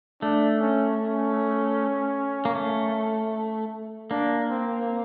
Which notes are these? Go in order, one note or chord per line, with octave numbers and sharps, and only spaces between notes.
A3 D4
C#4
C#4
A#3
A3
A#3 D4
C4